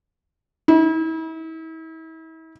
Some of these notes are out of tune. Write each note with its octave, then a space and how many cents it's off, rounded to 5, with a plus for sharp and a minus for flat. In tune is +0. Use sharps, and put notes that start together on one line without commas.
E4 -40